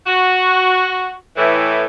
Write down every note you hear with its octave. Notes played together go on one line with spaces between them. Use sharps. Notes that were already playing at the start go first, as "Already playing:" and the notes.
F#4
A2 E3